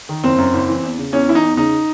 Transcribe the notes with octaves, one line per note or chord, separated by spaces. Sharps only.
D#3
F#1 C4
F#2
F#1
E3
E2
C#3
E2 C#4
E3 E4
D#4
E2
C#3 D#4